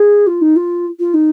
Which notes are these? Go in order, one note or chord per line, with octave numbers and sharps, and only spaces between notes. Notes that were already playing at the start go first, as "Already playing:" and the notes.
Already playing: G#4
F4
D#4
F4
F4
D#4